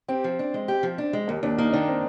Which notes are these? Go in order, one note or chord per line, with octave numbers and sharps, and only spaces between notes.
C4 G4
F3
D4
G#3
G4
F3
D4
G#3
D#2 A#3
D#2 D4
A#3 D#4
D#3 D4
C4